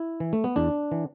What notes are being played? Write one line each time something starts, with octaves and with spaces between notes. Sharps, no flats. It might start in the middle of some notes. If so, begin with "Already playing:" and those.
Already playing: E4
E3
A3
B3
E2 D4
E3